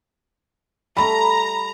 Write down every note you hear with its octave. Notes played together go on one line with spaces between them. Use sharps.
G3 A3 A#5 B5